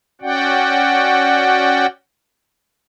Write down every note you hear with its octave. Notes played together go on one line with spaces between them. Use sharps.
C#4 F#4 D5 F#5 G5